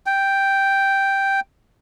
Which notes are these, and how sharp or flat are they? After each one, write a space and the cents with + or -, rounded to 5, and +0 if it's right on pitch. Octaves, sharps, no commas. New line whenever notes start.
G5 +0